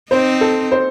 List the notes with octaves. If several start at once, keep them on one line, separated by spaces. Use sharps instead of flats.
C4 D#4 C5
A4
C5